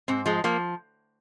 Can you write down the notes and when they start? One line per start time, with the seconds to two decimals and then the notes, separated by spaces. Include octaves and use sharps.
0.08 G#2 C4
0.26 F3 G#3
0.44 F3 A#3